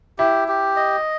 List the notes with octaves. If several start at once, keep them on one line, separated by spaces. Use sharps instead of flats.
E4 G4
G4
D#5